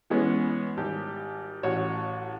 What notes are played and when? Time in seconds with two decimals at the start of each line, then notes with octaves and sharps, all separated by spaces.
0.10 E3 G#3 B3 C#4
0.77 G#1 G3 G4
1.63 A1 F#4 C#5